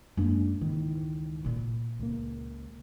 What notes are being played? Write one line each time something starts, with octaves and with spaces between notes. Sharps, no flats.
F#2 G#3 A#3 D4
C#2 G#2 D#3 E3
A#2 E4
C#2 A#3